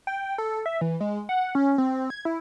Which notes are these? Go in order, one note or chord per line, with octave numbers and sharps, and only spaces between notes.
G5
A4
E5
E3
G#3
F#5
C#4
C4
G#6
E4